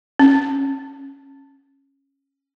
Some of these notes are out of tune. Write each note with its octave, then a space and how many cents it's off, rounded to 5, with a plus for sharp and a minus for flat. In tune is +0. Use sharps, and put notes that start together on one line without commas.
C#4 -10